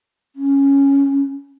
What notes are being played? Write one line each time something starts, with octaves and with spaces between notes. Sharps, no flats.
C#4